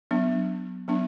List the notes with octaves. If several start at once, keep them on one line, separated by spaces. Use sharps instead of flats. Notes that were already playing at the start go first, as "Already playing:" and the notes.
F#3 B3 D4
F#3 B3 D4